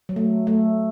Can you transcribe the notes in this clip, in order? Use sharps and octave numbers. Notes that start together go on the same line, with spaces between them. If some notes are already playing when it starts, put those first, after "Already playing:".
F#3
A3
A3